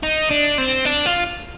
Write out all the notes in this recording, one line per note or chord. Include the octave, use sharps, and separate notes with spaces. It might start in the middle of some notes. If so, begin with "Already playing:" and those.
D#4
D4
C4
D4
F4